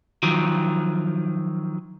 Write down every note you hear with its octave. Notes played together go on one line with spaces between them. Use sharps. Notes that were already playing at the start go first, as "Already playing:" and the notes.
D#3 F3 F#3